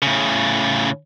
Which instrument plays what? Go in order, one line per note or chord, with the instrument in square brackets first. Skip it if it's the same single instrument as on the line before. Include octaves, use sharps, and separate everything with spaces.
[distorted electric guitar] A2 C#3